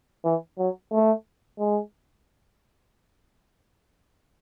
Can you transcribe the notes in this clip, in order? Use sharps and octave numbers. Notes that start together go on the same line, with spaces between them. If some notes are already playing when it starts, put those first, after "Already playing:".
E3
F#3
A3
G#3